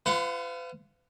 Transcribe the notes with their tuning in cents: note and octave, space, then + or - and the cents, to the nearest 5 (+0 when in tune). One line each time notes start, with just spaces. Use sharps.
F4 -30 B4 +45 F#5 -5